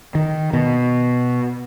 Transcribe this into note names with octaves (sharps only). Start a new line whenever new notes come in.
D#3
B2